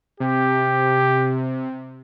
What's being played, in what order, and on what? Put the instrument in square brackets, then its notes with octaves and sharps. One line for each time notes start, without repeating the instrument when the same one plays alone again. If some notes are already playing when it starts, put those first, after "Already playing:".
[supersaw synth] C3 [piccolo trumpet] G4